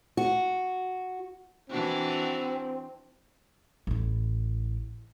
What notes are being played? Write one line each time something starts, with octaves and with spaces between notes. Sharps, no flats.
F#4
E3 C4 D4 F#4
A1 E4